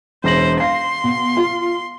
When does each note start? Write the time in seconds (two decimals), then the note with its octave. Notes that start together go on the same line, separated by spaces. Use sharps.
0.24 E1 C5 A#6 F#7
0.60 F5 C6 A#6 C7
1.04 B2
1.37 F4